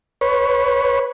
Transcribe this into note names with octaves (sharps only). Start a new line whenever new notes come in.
B4 C#5